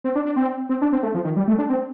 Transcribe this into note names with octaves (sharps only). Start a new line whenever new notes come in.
C4
D4
D4
C4
C4
D4
C4
A3
F3
D#3
G3
A3
D4
C4